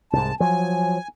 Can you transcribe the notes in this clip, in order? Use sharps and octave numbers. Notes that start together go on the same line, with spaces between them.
C2 G#2 A5
F3 F#3 G#5